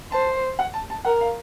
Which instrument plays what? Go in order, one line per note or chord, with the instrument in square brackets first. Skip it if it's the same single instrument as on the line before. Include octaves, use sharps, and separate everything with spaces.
[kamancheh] C5 [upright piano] A5
[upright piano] F#5
A5
A5
[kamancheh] A#4 [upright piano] F#5
[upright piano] F5